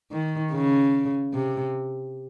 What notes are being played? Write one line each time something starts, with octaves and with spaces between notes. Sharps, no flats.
D#3
C#3
C3